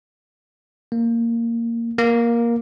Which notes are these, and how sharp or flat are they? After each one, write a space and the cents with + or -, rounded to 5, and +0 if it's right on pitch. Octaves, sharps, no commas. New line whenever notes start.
A#3 -10
A#3 +10